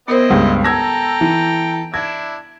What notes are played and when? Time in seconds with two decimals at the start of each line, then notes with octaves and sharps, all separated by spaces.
0.08 B3 C4 E4 A#4 C5 D#5
0.30 C#2 G2
0.64 A4 G5 A#5 E6 G#6 A#6
1.21 E3
1.94 D4 E4 G#6 A#6